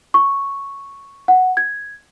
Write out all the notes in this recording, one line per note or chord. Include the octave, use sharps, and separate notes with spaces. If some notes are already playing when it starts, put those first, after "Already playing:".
C#6
F#5
G#6